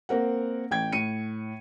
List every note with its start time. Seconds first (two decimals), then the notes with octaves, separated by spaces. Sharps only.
0.09 A#3 C4 A#4 F#5
0.71 A1 G5 G#6
0.92 A2 C#7 D#7